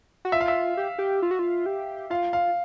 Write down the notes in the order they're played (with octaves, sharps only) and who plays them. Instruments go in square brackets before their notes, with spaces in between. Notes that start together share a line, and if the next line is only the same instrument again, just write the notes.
[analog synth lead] F#4
[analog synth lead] F4 [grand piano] E5
[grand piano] F5
E5
[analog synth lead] G4
G4
F4
F#4
F4
G4
[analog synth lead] F4 [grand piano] F5
[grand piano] F5